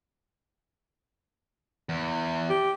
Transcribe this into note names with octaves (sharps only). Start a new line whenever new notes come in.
E2
G4